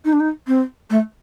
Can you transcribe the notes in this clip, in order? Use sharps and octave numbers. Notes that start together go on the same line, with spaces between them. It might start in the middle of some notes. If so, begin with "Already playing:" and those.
D#4
D4
D#4
C4
A3